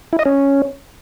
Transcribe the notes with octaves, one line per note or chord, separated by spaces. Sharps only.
E4
D#5
C#4